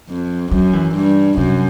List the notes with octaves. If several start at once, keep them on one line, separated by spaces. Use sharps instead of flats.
F2
F#2 F#3
E3
G2
F#2 C3